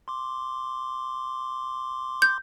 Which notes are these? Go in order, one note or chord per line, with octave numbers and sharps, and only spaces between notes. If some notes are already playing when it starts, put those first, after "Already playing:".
C6 D6
G6